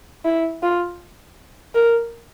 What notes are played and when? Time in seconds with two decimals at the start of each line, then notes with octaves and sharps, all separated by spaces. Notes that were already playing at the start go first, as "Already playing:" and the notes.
0.25 E4
0.62 F4
1.75 A#4